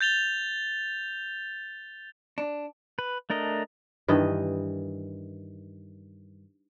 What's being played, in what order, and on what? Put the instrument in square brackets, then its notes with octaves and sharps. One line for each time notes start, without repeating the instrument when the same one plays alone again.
[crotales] G6 A6 F7 G7
[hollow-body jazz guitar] D4
[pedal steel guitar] B4
A3 D4 A#4 D#5
[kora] G2 D#3 E3 D#5